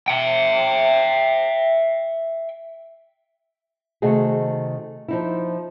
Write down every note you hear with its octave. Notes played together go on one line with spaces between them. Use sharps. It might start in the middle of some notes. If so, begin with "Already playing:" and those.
E5 G5
C3 D#3 A3 F#4 G#4
F3 D#4 E4